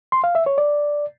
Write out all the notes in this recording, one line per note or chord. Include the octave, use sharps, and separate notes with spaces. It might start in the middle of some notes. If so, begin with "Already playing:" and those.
C6
F5
E5
C#5
D5